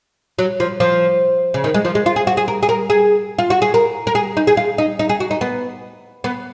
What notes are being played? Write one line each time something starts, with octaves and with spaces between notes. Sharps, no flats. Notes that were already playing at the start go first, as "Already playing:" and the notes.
F#3
F3
F3
C#3
D#3
G#3
F3
G#3
F4
G#4
F#4
G#4
A#4
G#4
A#4
G#4
F4
F#4
G#4
A#4
A#4
G#4
D#4
G#4
F4
D#4
D#4
G#4
F#4
D#4
B3
B3